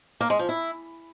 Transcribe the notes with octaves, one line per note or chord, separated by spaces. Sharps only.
A#3
G#3
F3
E4